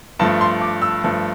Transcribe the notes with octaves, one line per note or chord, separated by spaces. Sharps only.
G2 F3 A3 A5
C6
D6
E6
G2 F3 A3